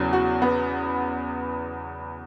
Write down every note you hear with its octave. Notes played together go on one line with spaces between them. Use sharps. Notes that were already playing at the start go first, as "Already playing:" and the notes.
Already playing: E2 C#3 F#3
F#4
B3